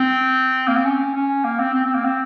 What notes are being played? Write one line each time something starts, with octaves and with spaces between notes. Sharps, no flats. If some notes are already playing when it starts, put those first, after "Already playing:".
Already playing: C4
A#3
C4
C#4
C#4
A#3
C4
C4
C4
A#3
C4